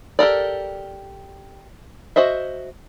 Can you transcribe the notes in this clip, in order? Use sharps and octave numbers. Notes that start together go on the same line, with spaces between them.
G4 A4 A#4 D5
F#4 C5 D#5 E5